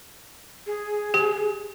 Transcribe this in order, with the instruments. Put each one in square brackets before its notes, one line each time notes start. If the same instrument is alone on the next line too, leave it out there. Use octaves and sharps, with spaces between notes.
[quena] G#4
[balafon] G4